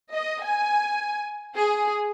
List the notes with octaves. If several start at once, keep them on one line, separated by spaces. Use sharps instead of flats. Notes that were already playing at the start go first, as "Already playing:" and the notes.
D#5
G#5
G#4